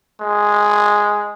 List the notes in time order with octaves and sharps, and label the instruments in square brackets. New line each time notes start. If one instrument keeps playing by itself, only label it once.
[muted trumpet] G#3